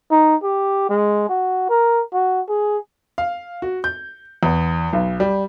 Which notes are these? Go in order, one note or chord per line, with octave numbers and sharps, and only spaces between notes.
D#4
G4
G#3
F#4
A#4
F#4
G#4
F5
F#4
G6
E2
B1
G3